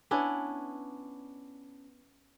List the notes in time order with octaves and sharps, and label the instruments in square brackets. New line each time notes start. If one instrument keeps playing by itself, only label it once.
[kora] B3 C#4 D4 E4